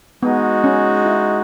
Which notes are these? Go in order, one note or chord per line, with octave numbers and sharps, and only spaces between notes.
G#3 B3 D#4 F#4
C#4
E4